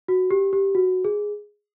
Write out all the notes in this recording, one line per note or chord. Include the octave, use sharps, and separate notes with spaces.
F#4
G4
G4
F#4
G#4